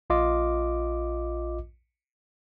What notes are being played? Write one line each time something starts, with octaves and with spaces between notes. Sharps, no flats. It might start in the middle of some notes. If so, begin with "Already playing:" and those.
A#1 F4 D#5 D6